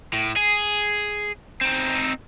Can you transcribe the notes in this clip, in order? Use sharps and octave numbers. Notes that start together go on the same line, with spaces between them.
A2
G#4
C4 D#4